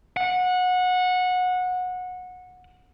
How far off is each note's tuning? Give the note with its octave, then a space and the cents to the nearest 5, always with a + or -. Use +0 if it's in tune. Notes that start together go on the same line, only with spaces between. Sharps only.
F#5 -20